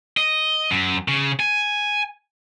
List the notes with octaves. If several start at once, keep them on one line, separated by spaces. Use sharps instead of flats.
D#5
F#2
C#3
G#5